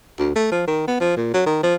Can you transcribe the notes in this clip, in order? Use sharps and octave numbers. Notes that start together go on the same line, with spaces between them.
D2
A3
F3
D#3
B3
F3
A#2
F#3
D#3
F3